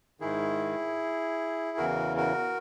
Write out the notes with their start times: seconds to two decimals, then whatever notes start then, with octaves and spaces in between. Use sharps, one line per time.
0.20 G#2 D#3 E4 G#4
1.77 E2 C#3 E3 F#4 A#4
2.17 F#4 A#4